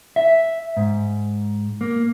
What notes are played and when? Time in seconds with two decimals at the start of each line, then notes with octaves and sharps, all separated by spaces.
0.16 E5
0.77 G#2
1.81 A#3